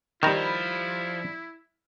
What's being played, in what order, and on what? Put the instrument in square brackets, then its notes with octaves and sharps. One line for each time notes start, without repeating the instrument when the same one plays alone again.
[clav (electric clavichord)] D#3 A#5 [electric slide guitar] F3 [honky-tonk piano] G3 B5 E7 [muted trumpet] E4